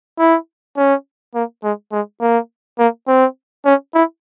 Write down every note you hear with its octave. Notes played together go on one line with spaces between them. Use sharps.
E4
C#4
A#3
G#3
G#3
A#3
A#3
C4
C#4
E4